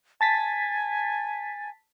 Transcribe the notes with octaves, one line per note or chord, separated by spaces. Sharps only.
G#5 A5 A6 B6